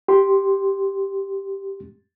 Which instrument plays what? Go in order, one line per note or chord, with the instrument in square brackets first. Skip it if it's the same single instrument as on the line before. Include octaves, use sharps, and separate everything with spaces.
[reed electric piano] G4 C6